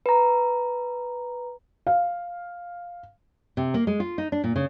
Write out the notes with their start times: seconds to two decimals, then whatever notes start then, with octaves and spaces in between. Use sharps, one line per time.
0.06 B4 A#5
1.87 F5
3.57 C3
3.74 A#3
3.87 G#3
4.00 F4
4.18 D#4
4.32 D4
4.44 A#2
4.56 C#3